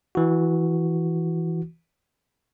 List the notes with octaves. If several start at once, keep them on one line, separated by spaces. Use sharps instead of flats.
E3 F#4